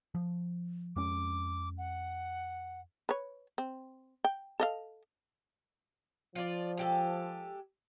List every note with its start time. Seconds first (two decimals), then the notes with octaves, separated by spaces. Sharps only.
0.15 F3
0.96 F2 G#3 C#4 D6
1.78 F#5
3.09 B4 C#5
3.58 C4
4.24 G5
4.60 A4 D#5 F5
6.35 F3 F4 D5
6.77 G#3 G4 A4